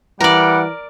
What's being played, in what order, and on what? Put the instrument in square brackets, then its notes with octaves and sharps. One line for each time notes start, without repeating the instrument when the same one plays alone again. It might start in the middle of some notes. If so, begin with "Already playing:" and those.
[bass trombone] E3 [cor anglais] G3 [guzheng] A#4 D5 [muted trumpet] F#5